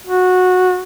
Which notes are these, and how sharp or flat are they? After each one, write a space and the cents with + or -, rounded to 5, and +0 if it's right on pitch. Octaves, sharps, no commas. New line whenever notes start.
F#4 -15